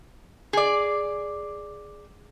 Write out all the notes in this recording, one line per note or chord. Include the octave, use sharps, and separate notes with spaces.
G#4 D5